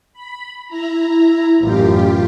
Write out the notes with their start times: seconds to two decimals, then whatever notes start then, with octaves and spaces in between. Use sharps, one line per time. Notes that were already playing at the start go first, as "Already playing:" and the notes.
0.13 B5
0.68 E4 A#5
1.60 A1 F#2 F4 G4